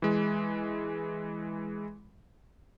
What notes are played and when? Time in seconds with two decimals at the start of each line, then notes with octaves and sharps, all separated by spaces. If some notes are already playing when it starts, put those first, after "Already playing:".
0.02 E3 G#3